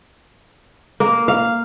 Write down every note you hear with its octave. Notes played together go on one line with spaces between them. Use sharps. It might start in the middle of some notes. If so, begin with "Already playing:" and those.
A#3
F5